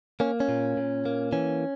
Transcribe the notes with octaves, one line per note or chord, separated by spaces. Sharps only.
A#3 C#4
C#4
A#2
A#2
A#3
E3 C#4